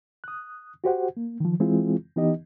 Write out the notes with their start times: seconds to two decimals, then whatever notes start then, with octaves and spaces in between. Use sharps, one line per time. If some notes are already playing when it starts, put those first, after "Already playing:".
0.24 D#6 F#6
0.84 F#4 G4 C5 F#5
1.17 A#3
1.40 D#3 F3
1.60 E3 G#3 C4 E4 F4 G#4
2.16 E3 B3 D#4 G4 D#5